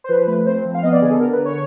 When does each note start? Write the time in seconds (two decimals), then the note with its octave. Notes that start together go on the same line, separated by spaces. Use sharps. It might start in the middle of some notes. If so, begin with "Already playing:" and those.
0.04 C5
0.09 F3 B4
0.27 A3 B4
0.46 C4 C5
0.65 F3
0.75 F5
0.83 B3 D#5
0.92 D5
1.02 D3 G#4
1.11 A4
1.20 D3 A#4
1.33 B4
1.39 D3
1.45 C#5